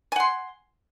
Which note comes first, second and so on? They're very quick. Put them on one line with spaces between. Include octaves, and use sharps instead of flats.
G#5 F#5 C6